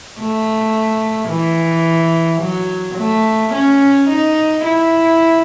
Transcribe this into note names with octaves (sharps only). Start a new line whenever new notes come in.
A3
E3
F#3
A3
C#4
D#4
E4